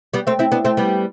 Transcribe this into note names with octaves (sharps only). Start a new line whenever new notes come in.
G3 B3
A3 C4
C4 E4
B3 D4
A3 C4
G3 B3